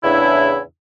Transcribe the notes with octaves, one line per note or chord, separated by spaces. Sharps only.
E2 A2 C#3 D4 E4